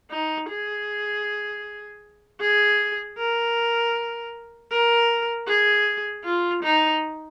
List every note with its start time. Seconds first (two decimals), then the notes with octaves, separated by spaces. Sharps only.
0.11 D#4
0.49 G#4
2.40 G#4
3.18 A#4
4.71 A#4
5.47 G#4
6.24 F4
6.63 D#4